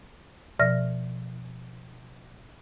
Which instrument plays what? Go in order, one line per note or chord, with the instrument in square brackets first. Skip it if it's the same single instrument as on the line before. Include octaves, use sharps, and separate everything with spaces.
[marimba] B2 F3 D5 E5 F6 A#6